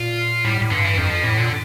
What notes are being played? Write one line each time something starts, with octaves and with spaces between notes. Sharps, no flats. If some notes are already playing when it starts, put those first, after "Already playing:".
Already playing: A#2 F4
A2 G3
A2
G2 D3
E3
F2 F3
F3
A2 E3
A#2 D3